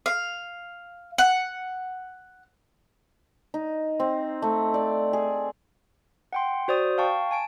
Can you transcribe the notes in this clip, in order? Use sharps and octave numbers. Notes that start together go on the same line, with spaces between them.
F5
F#5
D#4
C4
A3
D5
G#4
F#5 G5 C6
F#4 C5 D5 D#6
F5 G5 A5 C#6
G#5 A5 D7